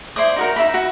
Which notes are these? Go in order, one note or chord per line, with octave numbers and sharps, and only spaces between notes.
E4 C5 D5 D#6
D#4 F#4 A#4
D#4 E5 B5
F#4